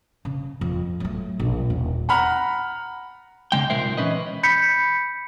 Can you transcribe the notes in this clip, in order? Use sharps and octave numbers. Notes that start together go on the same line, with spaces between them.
C#3
F2
F#3 A3
A#1
D#1
F#5 A#5 B5 F6
C#3 G#3 G5
B1 A#2 G#3 A#4 C5 E5
E3 F3 C#4 B4 D#5
B5 G6 B6 C#7